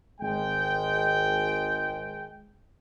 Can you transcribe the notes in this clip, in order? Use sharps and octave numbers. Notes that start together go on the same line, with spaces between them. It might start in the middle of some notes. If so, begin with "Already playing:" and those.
G#1 G#3 G5